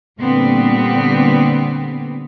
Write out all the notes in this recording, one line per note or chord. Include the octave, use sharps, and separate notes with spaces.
A#2 D3 G3 B3 C4